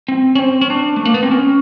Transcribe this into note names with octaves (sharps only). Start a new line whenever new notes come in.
C4
C#4
C4
C#4
D4
A3
A#3
B3
C4
C#4